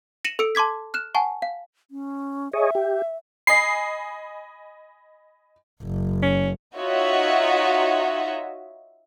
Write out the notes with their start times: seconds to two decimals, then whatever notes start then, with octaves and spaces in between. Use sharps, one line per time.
0.25 A#6 C#7 D#7 E7 F#7
0.39 A4 E6 C#7 D7
0.55 A5 C6 D6 G#6 B6
0.94 F6 F#6 E7
1.15 F#5 G#5 A5 C#6
1.42 F5
1.91 C#4
2.53 G#4 C#5 D#5 E5
2.75 G4
3.47 D#5 G#5 B5 C7
5.84 F#1
6.22 C#4
6.76 D#4 F4 F#4 C#5 D#5 E5